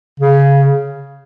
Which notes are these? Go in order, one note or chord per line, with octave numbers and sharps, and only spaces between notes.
C#3